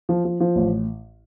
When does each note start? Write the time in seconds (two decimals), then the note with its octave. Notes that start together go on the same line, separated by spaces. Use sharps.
0.09 F3
0.25 F3
0.40 F3
0.56 A1